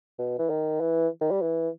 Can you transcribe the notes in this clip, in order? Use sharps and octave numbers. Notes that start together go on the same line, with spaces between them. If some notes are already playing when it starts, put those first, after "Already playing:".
B2
E3
D#3
E3
D#3
G3
E3